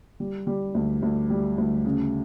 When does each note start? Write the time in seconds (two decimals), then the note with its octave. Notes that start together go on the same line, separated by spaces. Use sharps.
0.20 G3
0.47 G3
0.75 D2
1.02 D2
1.30 G3
1.58 D2
1.84 C#3